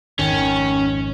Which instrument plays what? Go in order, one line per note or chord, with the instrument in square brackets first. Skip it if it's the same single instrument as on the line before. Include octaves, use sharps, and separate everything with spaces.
[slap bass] G#1 F2 [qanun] D#3 [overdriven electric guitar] C#4